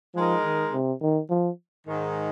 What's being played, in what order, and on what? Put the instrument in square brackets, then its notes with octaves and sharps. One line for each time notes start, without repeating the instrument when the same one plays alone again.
[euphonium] F3 [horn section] G#3 D#4 A#4
[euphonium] D#3
C3
D#3
F3
[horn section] G#2 D#3 G#3